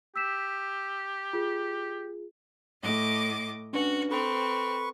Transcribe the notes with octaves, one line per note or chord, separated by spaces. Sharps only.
G4 E6 B6 E7
F4 G#4
A2 D#5 D6
C#4 D4 F#4 B4
C4 A4 B4 C#6